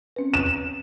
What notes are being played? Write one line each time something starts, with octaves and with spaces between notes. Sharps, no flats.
C4 C#4 B4
E7